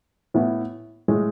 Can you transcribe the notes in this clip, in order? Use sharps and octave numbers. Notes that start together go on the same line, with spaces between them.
A2 E3 B3 E4
A2 G#3